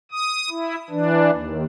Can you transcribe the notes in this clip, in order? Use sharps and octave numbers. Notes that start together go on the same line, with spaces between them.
D#6
E4
E3 D4
D#2